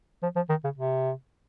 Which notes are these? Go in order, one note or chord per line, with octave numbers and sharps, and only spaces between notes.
F3
F3
D#3
C#3
C3